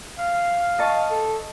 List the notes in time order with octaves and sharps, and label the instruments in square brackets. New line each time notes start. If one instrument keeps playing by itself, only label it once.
[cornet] F5
[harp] D#5 A5 C#6
[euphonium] A4